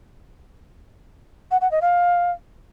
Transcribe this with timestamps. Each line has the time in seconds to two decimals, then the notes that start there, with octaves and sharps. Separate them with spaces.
1.51 F#5
1.61 F#5
1.71 D#5
1.82 F5